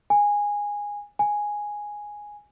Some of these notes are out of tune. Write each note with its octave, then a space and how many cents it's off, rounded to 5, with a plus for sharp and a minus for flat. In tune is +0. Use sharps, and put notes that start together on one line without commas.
G#5 -15
G#5 -5